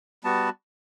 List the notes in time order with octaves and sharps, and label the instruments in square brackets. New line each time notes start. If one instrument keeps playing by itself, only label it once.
[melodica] G3 B3 F#4 A5